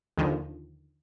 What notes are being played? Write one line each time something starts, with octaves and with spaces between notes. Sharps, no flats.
D#2 D3 D#3 F3